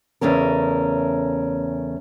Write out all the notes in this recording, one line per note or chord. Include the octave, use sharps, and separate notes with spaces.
E2 C#3 A3 C#4 A#4